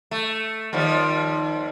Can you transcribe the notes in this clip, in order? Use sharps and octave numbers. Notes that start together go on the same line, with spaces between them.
A3
D#2 F3 G3